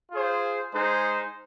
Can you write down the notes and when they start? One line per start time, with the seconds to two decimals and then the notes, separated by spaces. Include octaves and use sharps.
0.12 F4 G#4 C5
0.73 G#3 D#4 G#4 C5